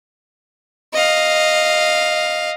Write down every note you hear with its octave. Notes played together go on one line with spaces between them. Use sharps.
D#5 F5